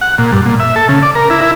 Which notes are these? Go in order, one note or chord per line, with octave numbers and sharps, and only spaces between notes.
F#5
A#2
G2
A#2
E5
A4
C#3
D5
A#4
E4
E4